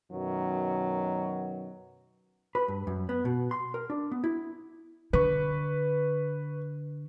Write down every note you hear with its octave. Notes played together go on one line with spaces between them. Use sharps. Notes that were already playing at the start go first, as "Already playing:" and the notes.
F#2 B2 D#3 F#3
B4
G2
F#2
B3
B2
C6
A#4
D4
B3
E4
D3 B4 C#6